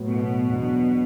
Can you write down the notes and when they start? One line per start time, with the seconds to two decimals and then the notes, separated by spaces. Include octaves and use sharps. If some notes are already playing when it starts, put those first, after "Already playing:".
Already playing: A2 F#3 B3
0.09 B2
0.49 E2 D3 F#3